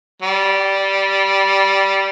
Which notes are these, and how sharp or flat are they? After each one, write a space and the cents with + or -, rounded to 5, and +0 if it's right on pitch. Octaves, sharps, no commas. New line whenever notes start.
G3 -10